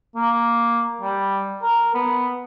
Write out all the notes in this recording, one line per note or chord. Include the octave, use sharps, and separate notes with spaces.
A#3
G3
A#4
B3